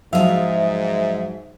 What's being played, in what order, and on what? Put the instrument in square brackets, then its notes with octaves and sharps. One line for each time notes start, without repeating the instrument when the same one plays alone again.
[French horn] G#2 [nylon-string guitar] F3 F#3 [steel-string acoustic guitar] G#4 F5 [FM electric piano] E5